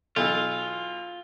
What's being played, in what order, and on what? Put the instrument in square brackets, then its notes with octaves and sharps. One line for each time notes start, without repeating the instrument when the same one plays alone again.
[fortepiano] B1 B2 E3 [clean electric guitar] F4